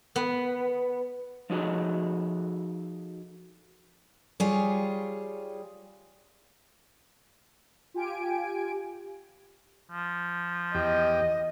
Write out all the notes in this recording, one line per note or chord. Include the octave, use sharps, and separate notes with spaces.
B3
F3 D#4 F#4 G#4 A4
G3 F4 G#4 C#5
F4 G4 G#5 D7
F3
E2 G4 D#5